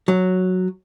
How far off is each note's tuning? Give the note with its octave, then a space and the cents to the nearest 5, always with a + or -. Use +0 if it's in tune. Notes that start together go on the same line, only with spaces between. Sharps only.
F#3 -5